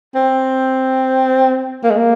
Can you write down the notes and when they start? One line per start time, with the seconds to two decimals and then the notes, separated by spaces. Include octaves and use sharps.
0.15 C4
1.84 A#3
1.91 G#3
1.98 A#3